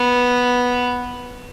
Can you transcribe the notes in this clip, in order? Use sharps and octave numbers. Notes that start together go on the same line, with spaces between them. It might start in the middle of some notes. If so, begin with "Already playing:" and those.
Already playing: B3